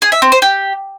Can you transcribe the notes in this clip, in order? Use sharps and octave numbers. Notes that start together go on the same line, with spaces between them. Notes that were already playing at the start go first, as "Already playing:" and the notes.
G#4
E5
C4
C5
G4